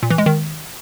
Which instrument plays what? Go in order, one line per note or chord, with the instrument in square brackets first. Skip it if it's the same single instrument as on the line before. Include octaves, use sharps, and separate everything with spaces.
[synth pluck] A#2
E3
G#3
D#3